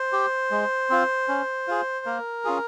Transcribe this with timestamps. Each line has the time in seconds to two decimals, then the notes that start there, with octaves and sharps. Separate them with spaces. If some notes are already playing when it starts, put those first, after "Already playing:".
Already playing: C5
0.13 G4
0.51 G#3
0.90 C4 F4
1.28 C#4
1.68 F4 G#4
2.06 A#3 A#4
2.45 C#4 F4 G#4